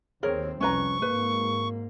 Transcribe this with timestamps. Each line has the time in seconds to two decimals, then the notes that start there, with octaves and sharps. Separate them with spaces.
0.23 D#2 C4 G#4 A#4 C#5
0.61 C2 F2 C#4 B4 A#5 C#6
1.02 G#1 G#2 A#3 B4